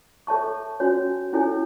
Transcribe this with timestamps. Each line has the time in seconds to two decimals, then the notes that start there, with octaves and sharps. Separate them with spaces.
0.27 A4 C#5 E5 A5 C#6
0.80 C#4 F#4 C#5 G#5
1.33 C#4 E4 A4 C#5 G#5